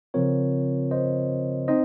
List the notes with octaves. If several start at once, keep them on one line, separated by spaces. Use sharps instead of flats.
C#3 F3 C4 F4 A#4 C#5
C5 D#5
C4 D#4 C5 D#5